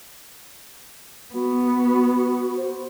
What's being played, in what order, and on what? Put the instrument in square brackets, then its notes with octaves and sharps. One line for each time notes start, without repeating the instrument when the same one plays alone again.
[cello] B3 [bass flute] F#4
[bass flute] C5